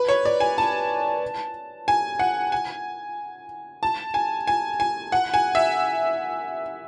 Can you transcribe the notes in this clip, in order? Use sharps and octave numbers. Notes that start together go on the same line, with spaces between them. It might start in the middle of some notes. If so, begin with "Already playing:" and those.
Already playing: B4
C#5
D5
G#5
A5
G#5
F#5
G#5
A5
G#5
G#5
G#5
F#5
G#5
E5